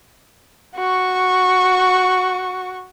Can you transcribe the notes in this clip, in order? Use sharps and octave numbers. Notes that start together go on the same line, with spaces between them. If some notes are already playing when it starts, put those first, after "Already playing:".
F#4 C#6